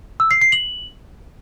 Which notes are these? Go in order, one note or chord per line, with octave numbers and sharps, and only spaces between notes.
E6
C7
C7
F#7